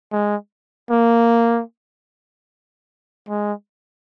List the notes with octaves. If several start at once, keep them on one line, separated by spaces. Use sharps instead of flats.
G#3
A#3
G#3